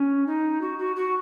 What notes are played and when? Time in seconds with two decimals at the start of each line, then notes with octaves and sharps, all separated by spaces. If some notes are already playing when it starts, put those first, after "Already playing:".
Already playing: C#4
0.27 D#4
0.61 F#4
0.78 F#4
0.96 F#4